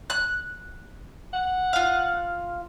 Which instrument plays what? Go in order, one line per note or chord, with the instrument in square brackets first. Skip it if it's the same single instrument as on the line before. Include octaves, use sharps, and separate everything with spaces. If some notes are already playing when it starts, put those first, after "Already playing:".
[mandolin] F#6
[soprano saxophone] F#5
[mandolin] F4 F5